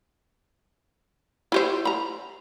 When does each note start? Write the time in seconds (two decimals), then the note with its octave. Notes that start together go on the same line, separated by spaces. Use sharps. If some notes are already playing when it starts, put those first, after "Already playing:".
1.52 E4 G4 C5
1.85 A#5 B5